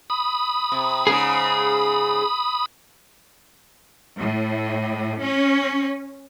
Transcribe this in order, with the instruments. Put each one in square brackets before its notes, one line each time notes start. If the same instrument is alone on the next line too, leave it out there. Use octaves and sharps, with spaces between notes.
[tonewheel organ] B5 D#6
[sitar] C3
[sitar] G#2 C#3 [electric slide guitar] G#4
[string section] A2
C#4